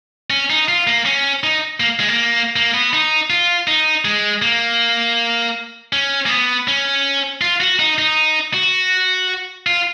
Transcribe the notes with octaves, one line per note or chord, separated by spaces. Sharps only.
C#4
D#4
F4
A#3
C#4
D#4
A#3
G#3
A#3
A#3
B3
D#4
F4
D#4
G#3
A#3
C#4
A#3
B3
C#4
F4
F#4
D#4
D#4
F#4
F4